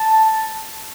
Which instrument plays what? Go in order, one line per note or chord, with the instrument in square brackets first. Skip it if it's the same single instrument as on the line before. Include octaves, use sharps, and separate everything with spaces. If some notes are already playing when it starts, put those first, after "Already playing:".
Already playing: [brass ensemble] A5